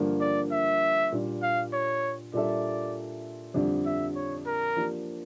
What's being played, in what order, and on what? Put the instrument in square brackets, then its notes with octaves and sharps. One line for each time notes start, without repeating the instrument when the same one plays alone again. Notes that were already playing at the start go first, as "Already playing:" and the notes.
Already playing: [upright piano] G2 D3 F3 A#3
[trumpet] D5
E5
[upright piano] A#2 G3 D4
[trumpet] F5
C#5
[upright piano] A#2 G3 D4 A4 E5 [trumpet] D5
[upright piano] F2 D3 G3 D4
[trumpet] E5
C#5
A#4
[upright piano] F3 A#3 D4 G4